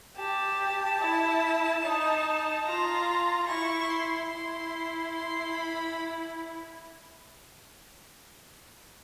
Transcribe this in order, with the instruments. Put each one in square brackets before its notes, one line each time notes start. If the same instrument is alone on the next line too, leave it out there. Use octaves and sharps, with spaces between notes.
[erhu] G4 [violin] A5
[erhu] E4
D#4
[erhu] F4 [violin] A#5
[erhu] E4 [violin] C#6
[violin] C6
[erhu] E4 [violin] C6
[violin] C6
B5